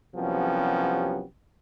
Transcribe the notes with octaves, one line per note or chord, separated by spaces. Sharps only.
C2 F3 F#3 B3 C#4 G4